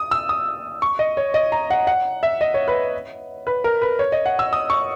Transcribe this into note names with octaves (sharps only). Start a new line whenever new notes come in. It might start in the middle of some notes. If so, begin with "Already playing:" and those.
Already playing: D#6
E6
D#6
C#6
D#5
C#5
D#5
A#5
F#5
F#5
E5
D#5
C#5
B4
B4
A#4
B4
C#5
D#5
F#5
E6
D#6
C#6